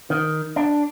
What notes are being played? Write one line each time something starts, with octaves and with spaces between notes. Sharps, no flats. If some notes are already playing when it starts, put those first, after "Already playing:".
D#3
D4